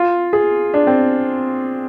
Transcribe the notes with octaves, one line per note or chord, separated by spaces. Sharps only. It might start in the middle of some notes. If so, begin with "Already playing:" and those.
Already playing: F4
G#4
D4
C4